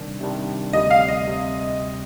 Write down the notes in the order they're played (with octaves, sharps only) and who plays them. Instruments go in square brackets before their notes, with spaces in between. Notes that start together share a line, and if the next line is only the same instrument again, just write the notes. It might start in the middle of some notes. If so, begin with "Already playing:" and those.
Already playing: [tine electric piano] C3 D#3 G3 D4
C3 D#3 G3 D4
[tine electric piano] D2 C3 G3 [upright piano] D#5
[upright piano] F5
D#5
[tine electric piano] C3